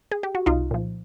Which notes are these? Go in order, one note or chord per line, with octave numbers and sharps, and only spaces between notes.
G#4
G4
F#4
C2 D#4 F4
A#2 F3